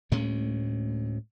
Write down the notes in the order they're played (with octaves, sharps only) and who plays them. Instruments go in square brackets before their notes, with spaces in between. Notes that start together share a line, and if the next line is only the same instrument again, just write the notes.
[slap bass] D2 A2 G#3 C#4